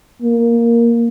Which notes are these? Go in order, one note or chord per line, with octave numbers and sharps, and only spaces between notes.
A#3